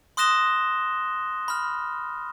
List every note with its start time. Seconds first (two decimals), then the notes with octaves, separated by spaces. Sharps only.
0.17 C6 D#6 F#6 A#6 E7 G7
1.48 B5 F6